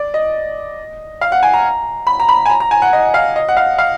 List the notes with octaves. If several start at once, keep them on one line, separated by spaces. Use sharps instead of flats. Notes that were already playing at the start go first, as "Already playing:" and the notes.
Already playing: D5
D#5
F5
F#5
G#5
A#5
B5
A#5
B5
G#5
A#5
A#5
G#5
F#5
D#5
F5
D#5
F#5
F5
F5